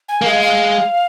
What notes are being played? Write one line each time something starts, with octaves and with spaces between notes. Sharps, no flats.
G#5
A#3
G#3 F5
F5